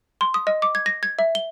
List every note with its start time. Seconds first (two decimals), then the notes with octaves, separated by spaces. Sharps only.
0.21 C6
0.34 D#6
0.47 D#5
0.62 D6
0.75 G#6
0.86 A#6
1.03 G#6
1.19 E5
1.35 G7